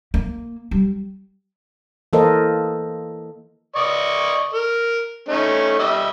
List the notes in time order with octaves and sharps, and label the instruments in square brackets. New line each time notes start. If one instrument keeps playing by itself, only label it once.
[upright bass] A#3
G3
[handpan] E3 A#3 A4 A#4 C5 D#5
[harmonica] D5 D#5 C#6
A#4
A3 C#4 D#4
G3 D#5 E5